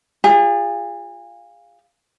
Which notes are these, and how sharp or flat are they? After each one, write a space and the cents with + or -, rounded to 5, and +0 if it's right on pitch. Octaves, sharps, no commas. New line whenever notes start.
F4 +0 G#4 -35